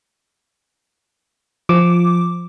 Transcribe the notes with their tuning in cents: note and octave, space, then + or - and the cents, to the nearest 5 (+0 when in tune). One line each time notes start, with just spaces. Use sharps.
F3 +0 D6 +0